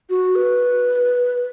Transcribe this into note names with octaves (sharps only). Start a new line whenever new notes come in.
F#4
B4